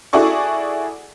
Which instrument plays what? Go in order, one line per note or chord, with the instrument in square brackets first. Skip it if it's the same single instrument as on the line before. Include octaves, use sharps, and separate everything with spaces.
[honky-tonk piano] E4 F#4 G#4 A4 D5 C#6